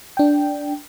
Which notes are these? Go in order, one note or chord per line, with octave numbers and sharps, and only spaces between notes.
D4 G5